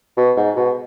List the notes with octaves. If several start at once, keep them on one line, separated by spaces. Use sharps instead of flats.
B2
G#2
B2